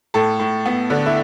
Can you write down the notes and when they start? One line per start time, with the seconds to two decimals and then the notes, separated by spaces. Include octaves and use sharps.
0.14 A2 A4
0.39 A2
0.65 B3
0.90 D3
1.06 E4